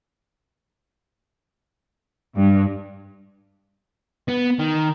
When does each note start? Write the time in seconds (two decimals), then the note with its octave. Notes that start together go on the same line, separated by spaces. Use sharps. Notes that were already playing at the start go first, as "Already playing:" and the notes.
2.35 G2
4.28 B3
4.59 D#3